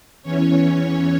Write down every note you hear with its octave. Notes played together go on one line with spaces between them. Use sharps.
E2 E3 C#4 C#5